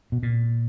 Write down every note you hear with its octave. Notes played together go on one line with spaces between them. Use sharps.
B2
A#2